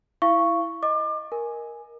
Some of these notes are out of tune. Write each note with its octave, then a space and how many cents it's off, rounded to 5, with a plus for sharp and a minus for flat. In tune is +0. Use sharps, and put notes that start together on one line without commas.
E4 +0 F5 -30 C#6 +0
D#5 +0 D6 +35
A#4 +10 G#5 +0